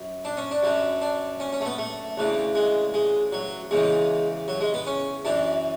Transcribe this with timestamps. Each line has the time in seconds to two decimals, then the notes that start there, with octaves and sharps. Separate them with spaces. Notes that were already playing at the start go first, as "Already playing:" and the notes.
Already playing: F#2
0.25 D4
0.37 C#4
0.51 D4
0.63 F#2 D3
1.02 D4
1.40 C#4
1.53 C#4
1.61 A3
1.66 B3
1.78 A3
2.17 D2 C#3 E3
2.55 G#3
2.94 G#3
3.32 F#3
3.71 E2 C#3 E3 G#3
4.48 F#3
4.61 G#3
4.74 B3
4.87 C#4
5.25 F#2 E3 D4